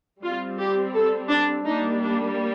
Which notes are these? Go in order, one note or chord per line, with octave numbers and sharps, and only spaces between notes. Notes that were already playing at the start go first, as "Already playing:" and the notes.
G3 C4 F4
G4
A4
D4
G3 A#3 D4 D#4
D4